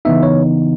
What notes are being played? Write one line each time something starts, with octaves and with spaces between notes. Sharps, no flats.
C#3 E3 B3 D#4 E5
C#5